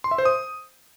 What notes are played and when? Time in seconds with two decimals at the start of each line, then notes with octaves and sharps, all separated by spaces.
0.04 C6
0.11 E5
0.18 C5
0.25 D#6